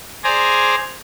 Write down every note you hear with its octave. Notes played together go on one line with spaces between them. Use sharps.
G#4 C5 D5 G#5 A#5